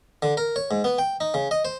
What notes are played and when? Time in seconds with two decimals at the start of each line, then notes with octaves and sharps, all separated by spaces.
0.22 D3
0.37 A#4
0.56 C#5
0.71 G#2
0.84 B3
0.98 G5
1.21 D#4
1.34 C#3
1.51 D#5
1.65 C5